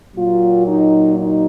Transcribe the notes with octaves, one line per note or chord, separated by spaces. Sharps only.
A#2 F#3 F4
D#4
D#4